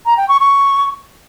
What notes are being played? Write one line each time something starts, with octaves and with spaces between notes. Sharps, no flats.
A#5
G5
C#6
C#6